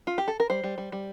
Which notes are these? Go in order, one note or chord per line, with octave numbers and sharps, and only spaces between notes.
F4
G4
A4
A#4
G3 C5
G3
G3
G3